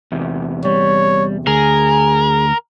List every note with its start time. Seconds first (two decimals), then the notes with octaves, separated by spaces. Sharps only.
0.12 E2 C3
0.65 G3 C#5
1.47 D2 G#4 A#4 G#5